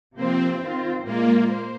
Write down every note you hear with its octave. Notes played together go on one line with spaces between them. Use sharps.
C3 F3 A#3 C4 F4 C5
D#3 C4 F4 C5
A#2 G#3 A#3 F4
C5